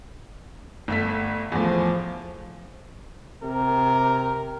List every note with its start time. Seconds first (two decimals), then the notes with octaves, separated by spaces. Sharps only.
0.88 G1 A3 B6
1.52 E2 A2 F3
3.43 C3 A#4